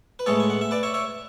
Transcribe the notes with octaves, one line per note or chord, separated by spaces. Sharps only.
B4
A2 G#3 B3 A4 C#5
G#5
F#5
E5
B4 D5
C#5 E5
C#5 E5